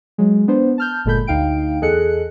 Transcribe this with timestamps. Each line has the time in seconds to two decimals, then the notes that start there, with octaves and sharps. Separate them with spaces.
0.18 F#3 G#3
0.48 B3 D4 C5
0.78 A5 F6 G6
1.05 G1 A#2 G#3 A4 B5 G6
1.27 D2 D#4 F5 G5 D7
1.82 E2 G#4 A4 D#5 F#6 C#7